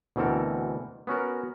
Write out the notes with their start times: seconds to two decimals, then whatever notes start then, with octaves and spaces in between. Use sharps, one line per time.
0.16 D2 B2 E3 C4 A4 A#4
1.07 B3 C#4 F#4 A#4